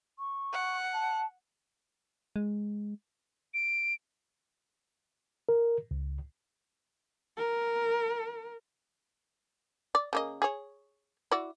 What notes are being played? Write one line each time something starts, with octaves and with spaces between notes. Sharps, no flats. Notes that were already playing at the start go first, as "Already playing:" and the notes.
C#6
F#5
A5
G#3
D7
A#4
C#2
A#4
D5
C#3 A#3 D#5
G#4 C#5
E4 F#4 D5